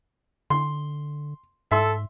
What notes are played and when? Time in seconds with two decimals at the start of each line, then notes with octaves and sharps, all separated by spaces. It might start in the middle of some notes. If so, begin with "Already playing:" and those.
0.50 D3 C6
1.71 G#2 A4 E5 C6